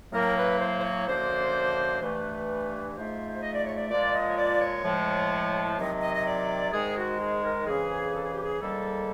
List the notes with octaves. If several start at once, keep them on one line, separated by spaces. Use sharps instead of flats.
A2 F#3 A#3 A#4
B4
C5
C5
C#5
F#2 D3 F3 A#3 C5
G2 E3 A3 B4
G#2 F3 A3 C5
D#5
D5
C#5
D5
A#2 F3 G#3 D5
D#5
C#5
D5
C#5
A2 F3 G#3
C3 D#3 F#3 D#5
D#5
D#5
D5
G#2 D#3 G#3 G#4
F#4
G#4
A#4
F2 C#3 E3 G#4
A4
G#4
G4
G#4
G#2 D#3 G3 A#3 A4